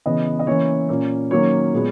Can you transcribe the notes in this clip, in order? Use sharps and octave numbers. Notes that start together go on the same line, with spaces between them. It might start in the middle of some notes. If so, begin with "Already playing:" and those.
C#3 E3 B3 D#5
D#5
E3 A#3 C#4 C#5
A#2 A#3 C#4
D#3 F#3 A#3 C#4 C#5
A#2 G#3 B3